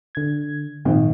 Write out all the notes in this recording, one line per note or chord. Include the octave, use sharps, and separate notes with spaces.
D3 G#6
G#1 A#2 F3 C4